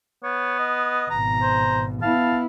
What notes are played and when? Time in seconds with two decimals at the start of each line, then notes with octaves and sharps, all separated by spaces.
0.24 B3 C#5
0.59 D#5
1.11 G#1 B2 A#5
1.42 C5
2.02 B3 E4 F5 A5